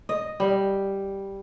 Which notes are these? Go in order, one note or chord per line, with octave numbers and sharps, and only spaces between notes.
D#5
G3